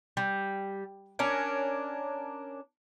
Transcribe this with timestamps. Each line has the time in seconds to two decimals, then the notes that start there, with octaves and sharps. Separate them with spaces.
0.17 G3
1.19 C#4 D4 A#4